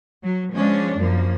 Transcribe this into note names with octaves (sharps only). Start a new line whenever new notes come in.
F#3
F3 G#3 C#4 D4
F#2 F3 A#3